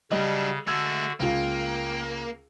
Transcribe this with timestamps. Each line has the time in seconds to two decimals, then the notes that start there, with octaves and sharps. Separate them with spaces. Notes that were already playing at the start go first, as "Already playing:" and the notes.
0.12 C#3 F#3 G3 D4 D#5
0.67 D3 G#3 A3 F#4 E6 G#6
1.20 C#2 A#3 F4 G5